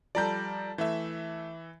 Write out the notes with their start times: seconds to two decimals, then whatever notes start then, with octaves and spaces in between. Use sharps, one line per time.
0.15 F3 G3 A4 D5 A#5 G6
0.78 E3 A3 E5